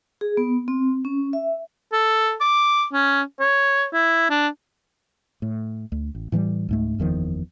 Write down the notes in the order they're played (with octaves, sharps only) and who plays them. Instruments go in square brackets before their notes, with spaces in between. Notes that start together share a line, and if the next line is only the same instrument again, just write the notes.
[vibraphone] G#4
B3
C4
C#4
E5
[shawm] A4
D6
C#4
C#5
E4
D4
[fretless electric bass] A2
D2
A1
A2 E3 F#3 G3
C#2 G#2 A3
F#1 E2 D#3 F3